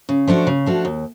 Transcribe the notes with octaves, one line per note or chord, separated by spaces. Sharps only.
C#3
F3 A3 D4 F#4
C#3
F3 A3 D4 F#4
D#2